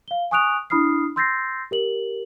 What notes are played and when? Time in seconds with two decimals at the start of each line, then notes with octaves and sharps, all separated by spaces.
0.08 F5 G7
0.31 G#5 C#6 D#6 F#6 D7 F7
0.70 D4 E4 B5 D#6 F6 C7
1.16 C6 E6 G6 A6 A#6 C7
1.71 G4 A#4 F#7